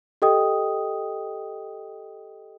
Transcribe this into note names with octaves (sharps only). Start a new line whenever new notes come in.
G4 A4 D#5 G5 D#6